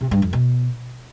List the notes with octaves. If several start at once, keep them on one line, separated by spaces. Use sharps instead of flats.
C3
G2
F2
B2